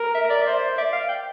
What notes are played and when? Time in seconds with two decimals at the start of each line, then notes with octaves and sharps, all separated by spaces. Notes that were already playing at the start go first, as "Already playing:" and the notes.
Already playing: A#4
0.15 E5
0.30 D5
0.42 C5 E5
0.54 D5
0.77 D5 E5
0.93 F5
1.08 G5